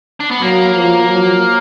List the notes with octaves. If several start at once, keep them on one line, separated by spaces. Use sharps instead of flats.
D4
B3
F#3 A#3
F3
F#3